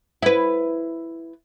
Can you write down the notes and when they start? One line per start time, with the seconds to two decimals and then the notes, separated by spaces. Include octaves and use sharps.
0.23 E4 B4